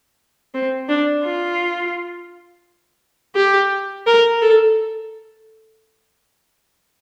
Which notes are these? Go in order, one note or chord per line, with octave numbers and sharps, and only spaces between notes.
C4
D4
F4
G4
A#4
A4